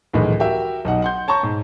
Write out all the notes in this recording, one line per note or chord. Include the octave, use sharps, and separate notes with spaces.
C#2 F#2 A2 D#3 E3 G#3
F#4 G4 A#4 E5
B1 D#4 F#5
F#5 C6 G6
C#5 A5 A#5 C#6
G#2